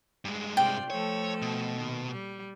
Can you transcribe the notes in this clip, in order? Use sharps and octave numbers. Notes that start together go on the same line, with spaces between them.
G2 G#3
C3 F4 D5 G5
F3 A3 A4 C#5
B2
A#2 D#3
G3